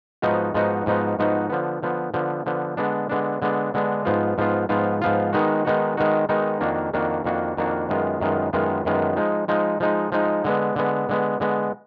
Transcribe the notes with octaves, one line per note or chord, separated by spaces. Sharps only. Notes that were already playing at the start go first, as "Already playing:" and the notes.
G#2 F3 B3 D#4 F#4
G#2 F3 B3 D#4 F#4
G#2 F3 B3 D#4 F#4
G#2 F3 B3 D#4 F#4
D3 F3 B3
D3 F3 B3
D3 F3 B3
D3 F3 B3
D3 G#3 B3 D4
D3 G#3 B3 D4
D3 G#3 B3 D4
D3 G#3 B3 D4
G#2 F3 B3 F4
G#2 F3 B3 F4
G#2 F3 B3 F4
G#2 F3 B3 F4
D#3 G#3 B3 D#4 F#4
D#3 G#3 B3 D#4 F#4
D#3 G#3 B3 D#4 F#4
D#3 G#3 B3 D#4 F#4
F2 D#3 A#3 D4 F#4
F2 D#3 A#3 D4 F#4
F2 D#3 A#3 D4 F#4
F2 D#3 A#3 D4 F#4
F#2 D#3 G#3 B3 F4
F#2 D#3 G#3 B3 F4
F#2 D#3 G#3 B3 F4
F#2 D#3 G#3 B3 F4
F3 G#3 D#4
F3 G#3 D#4
F3 G#3 D#4
F3 G#3 D#4
D3 G#3 B3
D3 G#3 B3
D3 G#3 B3
D3 G#3 B3